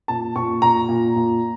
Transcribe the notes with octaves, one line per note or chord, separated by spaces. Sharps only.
A#2 A5
A#2 C#6
A#2 A#5
A#2
A#2